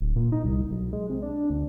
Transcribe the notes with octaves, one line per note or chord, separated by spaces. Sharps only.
D1
A#2
D#4
C2
B1
G#3
C3
D4
D2